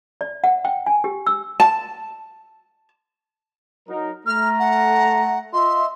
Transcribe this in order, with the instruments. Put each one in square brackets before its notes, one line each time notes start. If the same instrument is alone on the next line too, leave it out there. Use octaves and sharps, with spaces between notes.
[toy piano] D5
F#5
G5
G#5
G4
E6
[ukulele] A5
[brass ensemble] F#3 D#4 A#4
[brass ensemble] A3 A#5 [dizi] F6
[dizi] F#5
[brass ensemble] F4 D#5 E5 [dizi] C6